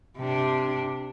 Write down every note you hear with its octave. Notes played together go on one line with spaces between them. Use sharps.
C3 D4